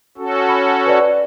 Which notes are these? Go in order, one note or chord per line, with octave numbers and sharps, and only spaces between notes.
C#4 F#4 A4
B5
B4 D5